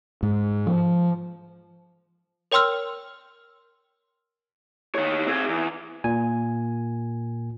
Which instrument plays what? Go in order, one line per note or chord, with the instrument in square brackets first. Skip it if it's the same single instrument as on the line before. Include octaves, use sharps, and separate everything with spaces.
[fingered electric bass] G#2
F3
[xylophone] A#4 C#5 G5 C6 E6 F6
[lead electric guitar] D#3 C#5
C4 G#4
E2
[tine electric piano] A#2 G#5